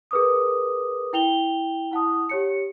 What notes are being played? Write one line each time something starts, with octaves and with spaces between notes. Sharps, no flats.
G#4 A#4 B4 D6 D#6
E4 G5 F7 G7
E4 F#5 A5 D#6
G4 C#5 C#7